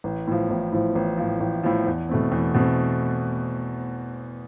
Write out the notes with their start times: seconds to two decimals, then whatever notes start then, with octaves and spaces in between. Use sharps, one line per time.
0.04 A1
0.27 A2 F3
0.50 A1
0.72 A2 F3
0.95 A1
1.18 A2 F3
1.40 A1
1.63 A2 F3
1.87 E2
2.09 B2 A3 C4
2.32 E2
2.54 B2 A3 C4